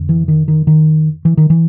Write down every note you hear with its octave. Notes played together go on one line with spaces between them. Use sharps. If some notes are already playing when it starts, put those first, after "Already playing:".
Already playing: F2 D3
E3
D#3
D#3
D#3
E3
D#3
E3